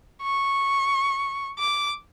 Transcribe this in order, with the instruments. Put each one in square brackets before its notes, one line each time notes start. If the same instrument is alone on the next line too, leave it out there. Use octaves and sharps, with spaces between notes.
[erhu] C#6
D6